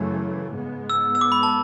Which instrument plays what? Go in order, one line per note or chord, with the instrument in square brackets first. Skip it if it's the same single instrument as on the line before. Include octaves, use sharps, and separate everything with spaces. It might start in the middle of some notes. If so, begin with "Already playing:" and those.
Already playing: [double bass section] F#2 C#3 E3 A3
G#2 G#3 B3
[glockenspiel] E6
E6
D6
B5
A5